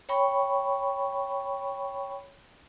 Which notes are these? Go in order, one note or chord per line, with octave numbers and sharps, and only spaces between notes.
C#5 G5 B5 C#6